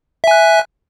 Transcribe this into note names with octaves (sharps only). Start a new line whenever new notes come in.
E5 G#5 F#6